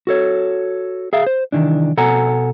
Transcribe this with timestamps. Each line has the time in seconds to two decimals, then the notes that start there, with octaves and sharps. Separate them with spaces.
0.07 F#4 A4 C#5
1.13 G#4 E5 F5
1.26 C5
1.52 C2 F#2 D#3 E3 D4
1.97 B2 A4 F#5 G#5 A#5